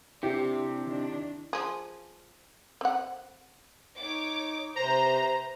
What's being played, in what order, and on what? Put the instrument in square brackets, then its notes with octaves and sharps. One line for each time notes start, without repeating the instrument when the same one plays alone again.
[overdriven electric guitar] C3 [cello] D4 [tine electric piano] E4 [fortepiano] G4
[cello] D#3 D4
[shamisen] F3 G#4
C4 F#5
[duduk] D#4 [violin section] C#5 D6
[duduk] C3 [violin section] B4 C5 [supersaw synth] A#5